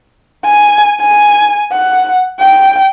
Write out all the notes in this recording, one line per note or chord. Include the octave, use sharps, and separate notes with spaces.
G#5
G#5
F#5
G5